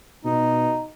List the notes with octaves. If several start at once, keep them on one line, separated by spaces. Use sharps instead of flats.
B2 D#4